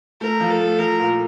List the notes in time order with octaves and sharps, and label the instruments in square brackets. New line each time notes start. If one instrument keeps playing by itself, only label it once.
[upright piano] A3 [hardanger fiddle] A#4
[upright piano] F3
[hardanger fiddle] A4
[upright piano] A3
[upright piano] F3 [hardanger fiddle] A#4
[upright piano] A#2